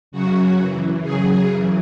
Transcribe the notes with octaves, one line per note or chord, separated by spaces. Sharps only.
F#2 C#3 F#3 F#4
F#2 E3
F#2 C#3 F#3 G#4
F#2 C#3 E3